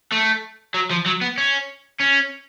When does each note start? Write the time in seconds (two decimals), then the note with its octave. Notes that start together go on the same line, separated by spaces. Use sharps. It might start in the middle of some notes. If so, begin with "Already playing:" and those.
0.12 A3
0.74 F#3
0.91 F3
1.06 F#3
1.21 B3
1.38 C#4
2.00 C#4